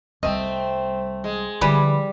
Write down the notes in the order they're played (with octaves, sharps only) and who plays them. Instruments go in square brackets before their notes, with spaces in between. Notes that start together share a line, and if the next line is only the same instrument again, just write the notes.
[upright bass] C2 G3 [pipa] A3 D#5 [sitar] C4
[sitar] G#3
[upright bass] D3 F3 [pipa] E3 B4 [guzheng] G3